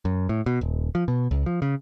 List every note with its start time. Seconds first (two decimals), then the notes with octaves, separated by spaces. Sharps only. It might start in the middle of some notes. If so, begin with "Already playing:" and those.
0.05 F#2
0.29 A2
0.46 B2
0.61 D#1
0.95 F3
1.08 B2
1.31 C#2
1.46 F3
1.62 C#3